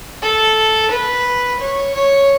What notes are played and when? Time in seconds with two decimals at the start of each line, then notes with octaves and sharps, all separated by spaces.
0.22 A4
0.91 B4
1.59 C#5
1.94 C#5